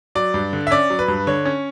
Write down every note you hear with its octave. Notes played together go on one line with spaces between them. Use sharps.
F#3 D5
G2
D3
E5
C#4 D5
F#3
B4
G2
D3 C#5
C#4